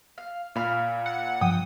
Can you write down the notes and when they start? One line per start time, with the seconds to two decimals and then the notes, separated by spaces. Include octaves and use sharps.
0.18 F5
0.56 A#2 F5 B5 F6
1.06 F#5
1.41 G2 F3 G5 D#6